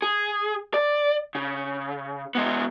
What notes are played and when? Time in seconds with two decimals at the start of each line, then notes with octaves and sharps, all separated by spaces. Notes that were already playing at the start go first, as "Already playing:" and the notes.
0.02 G#4
0.74 D5
1.35 C#3
2.35 G#3 B3